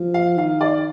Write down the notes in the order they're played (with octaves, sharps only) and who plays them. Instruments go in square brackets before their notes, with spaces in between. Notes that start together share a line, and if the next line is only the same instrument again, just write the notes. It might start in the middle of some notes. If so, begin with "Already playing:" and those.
Already playing: [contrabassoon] F3
[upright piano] F5
[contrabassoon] D#3 [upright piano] F5
[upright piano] D5